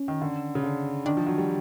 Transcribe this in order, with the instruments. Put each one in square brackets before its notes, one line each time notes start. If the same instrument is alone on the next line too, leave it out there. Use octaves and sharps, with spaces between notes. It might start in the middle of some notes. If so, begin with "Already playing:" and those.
Already playing: [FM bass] C#4
[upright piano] D#3
D3
C#3
D3
[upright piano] D#3 [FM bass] D4
[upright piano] F3
F#3
G3